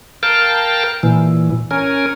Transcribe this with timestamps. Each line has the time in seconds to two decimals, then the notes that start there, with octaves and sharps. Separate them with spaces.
0.23 A#4 F5 G5 A5
1.03 A#2 E3
1.71 C#4 A#4 G#5